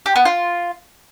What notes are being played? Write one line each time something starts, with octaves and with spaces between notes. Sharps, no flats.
G4
B3
F4